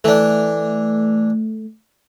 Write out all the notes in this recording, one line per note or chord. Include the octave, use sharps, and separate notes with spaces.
E3 A3 D4